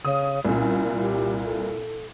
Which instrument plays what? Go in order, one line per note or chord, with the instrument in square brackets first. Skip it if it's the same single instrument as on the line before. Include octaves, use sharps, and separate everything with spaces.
[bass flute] C#3 [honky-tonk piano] D#6
[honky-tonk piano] C2 A#2 [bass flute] C#4
[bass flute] G4
A4